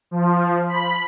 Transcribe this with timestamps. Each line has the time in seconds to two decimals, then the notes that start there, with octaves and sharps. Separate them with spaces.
0.11 F3
0.68 B5